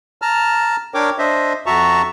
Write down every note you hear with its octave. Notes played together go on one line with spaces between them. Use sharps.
A5 A#5 F6
D4 A#4 C#5 G5 D6
D4 C5 D#5 E5
F2 F#4 E5 A5 A#5 C#6